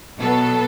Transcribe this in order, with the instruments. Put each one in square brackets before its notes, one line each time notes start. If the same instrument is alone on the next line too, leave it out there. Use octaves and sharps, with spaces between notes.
[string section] B2 F#3 B3 A4